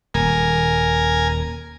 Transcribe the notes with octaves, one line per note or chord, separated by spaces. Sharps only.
D#1 A#4 G#5